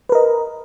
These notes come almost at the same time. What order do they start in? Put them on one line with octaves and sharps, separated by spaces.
B4 A#4 D#5